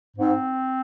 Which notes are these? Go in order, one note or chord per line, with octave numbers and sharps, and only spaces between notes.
G#2 C4